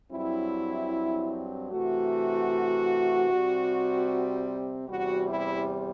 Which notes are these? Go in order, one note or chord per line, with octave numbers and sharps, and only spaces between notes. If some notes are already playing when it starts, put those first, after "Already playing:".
G2 F#3 C4 E4
C3 E3 A3 F#4
C3 G3 C4
E2 C3 G3 F#4
E4